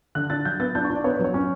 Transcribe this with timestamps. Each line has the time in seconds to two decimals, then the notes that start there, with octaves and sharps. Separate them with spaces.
0.15 D3 F#6
0.30 D4 A6
0.45 F#3 G6
0.60 B3 A6
0.75 D4 G6
0.85 C#6
0.90 D4
0.95 D5
1.04 B3 C#5
1.14 B4
1.19 F#3
1.24 C#5
1.34 C#4